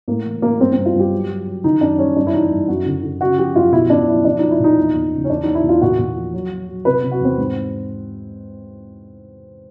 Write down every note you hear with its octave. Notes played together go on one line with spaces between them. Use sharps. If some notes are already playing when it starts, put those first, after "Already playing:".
A2 A#3
E3
A2 A#3
G2 C4
G2 C4
F4
G2
G4
F#3
F#3
F#3
D#3 D#4
F#2 D4
G3 C#4
G2 D4
E4
E3 D#4
G2
F#2 F#4
D3
D3
C#3 F#4
F3 G4
F#2 F4
B2 E4
B2 D4
F#3 E4
F3 D4
F3 D#4
E4
A#2 D#4
E2
E2
C#3
C#4
E2 D4
E2 D#4
E4
E2
F4
A#2 F#4
A#2
F3
F#3
F#3
F#3
C3 B4
C3
F#4
E2 C4
G#2